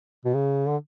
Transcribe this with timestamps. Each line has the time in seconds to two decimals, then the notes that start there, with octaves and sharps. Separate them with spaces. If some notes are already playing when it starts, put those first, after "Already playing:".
0.25 B2
0.34 C#3
0.68 D3